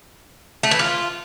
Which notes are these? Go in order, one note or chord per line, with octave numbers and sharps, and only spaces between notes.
A3
E3
F4